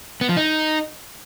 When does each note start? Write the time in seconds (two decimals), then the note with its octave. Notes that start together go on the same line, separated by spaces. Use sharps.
0.21 B3
0.29 F3
0.37 D#4